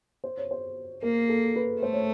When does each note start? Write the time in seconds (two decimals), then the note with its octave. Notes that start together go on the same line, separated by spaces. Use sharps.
0.24 C5
0.37 C#5
0.51 C5
1.02 A#3 A#4
1.29 A4
1.56 B4
1.82 A3 C5
1.93 C#5